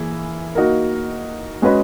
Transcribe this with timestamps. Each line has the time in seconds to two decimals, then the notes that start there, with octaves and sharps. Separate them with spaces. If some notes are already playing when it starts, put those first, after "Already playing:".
Already playing: E3 A#3 E4 G#4
0.55 A#3 D#4 F#4 A#4
1.62 G#3 C#4 F#4 B4 D#5